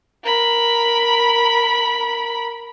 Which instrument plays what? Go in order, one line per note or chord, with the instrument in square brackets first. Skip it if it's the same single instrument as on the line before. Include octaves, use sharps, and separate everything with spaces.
[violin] A#4 B5